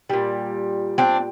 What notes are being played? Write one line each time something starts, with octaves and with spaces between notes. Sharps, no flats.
A#2 G3
C4 D4